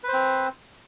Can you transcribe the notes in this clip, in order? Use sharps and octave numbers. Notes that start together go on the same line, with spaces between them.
C4 B4 C5